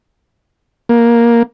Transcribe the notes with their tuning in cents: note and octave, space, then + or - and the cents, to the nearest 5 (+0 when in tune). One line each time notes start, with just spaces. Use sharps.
A#3 +10